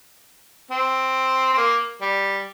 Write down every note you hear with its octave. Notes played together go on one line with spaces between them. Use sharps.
C4
C4
A#3
G3